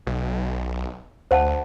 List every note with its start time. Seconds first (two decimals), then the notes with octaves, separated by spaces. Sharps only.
0.07 B1
1.31 D2 C5 F#5 A5